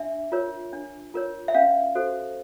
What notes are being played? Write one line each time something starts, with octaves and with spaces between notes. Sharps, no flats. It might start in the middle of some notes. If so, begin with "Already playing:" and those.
Already playing: D4 E5
F4 A#4 C#5
D4
F4 A#4 C#5
E5
C#4 F5
F#4 A4 C5